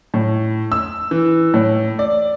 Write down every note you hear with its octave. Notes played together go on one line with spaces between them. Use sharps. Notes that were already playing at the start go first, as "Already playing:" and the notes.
A2
E6
E3
A2
D5